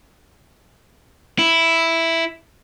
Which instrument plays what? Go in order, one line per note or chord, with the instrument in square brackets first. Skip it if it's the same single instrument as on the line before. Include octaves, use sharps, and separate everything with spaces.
[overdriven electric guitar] E4